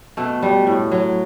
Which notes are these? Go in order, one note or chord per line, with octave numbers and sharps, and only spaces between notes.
B2 A3
G3
A2
F#3